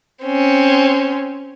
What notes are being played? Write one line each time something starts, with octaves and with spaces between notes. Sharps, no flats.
C4 C#4